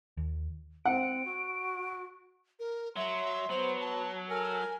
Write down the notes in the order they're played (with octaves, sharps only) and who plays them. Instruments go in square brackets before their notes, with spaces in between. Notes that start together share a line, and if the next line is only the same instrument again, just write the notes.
[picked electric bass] D#2
[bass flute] C4 [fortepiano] F#5 [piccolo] D7
[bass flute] F#4
[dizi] A#4
[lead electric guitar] F#3 [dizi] E5 [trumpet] C6
[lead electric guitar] F#3 [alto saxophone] B3 [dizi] C5
[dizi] A5
[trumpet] A4 [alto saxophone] A#4 [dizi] G#5